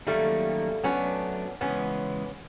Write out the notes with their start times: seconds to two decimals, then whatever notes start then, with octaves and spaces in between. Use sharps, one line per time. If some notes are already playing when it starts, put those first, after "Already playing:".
0.07 D#3 F#3 G3 A3 A#3 C#4
0.84 F#3 A3 B3 C#4 D4
1.61 C#3 E3 G#3 B3 C#4